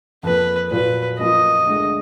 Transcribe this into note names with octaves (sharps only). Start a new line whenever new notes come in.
F2 F3 A#3 B4
A#2 F#3 A#3 F4 B4
F#2 F3 A#3 F4 D#5
D2 D3 G#3